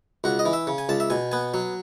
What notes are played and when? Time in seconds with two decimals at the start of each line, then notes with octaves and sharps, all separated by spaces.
0.24 C#2 F#4
0.39 D#5
0.45 E3
0.53 E5
0.67 C#3
0.78 G#5
0.89 C#2 A5
1.00 E5
1.10 B2 G#5
1.32 B3 G#5
1.54 F#3